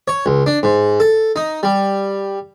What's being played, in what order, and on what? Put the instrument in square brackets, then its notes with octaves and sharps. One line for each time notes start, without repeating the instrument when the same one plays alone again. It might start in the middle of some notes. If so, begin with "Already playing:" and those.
[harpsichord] C#5
C#2
D4
G#2
A4
D#4
G3